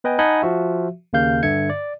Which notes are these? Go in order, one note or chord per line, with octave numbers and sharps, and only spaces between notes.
B3 B4 D#5 G5 G#5
D#4 D#5 F#5 G#5 A5 B5
F3 F#4 E5
D#2 C#3 A#3 F5 G6
G2 D3 E5 G#6 C#7
D5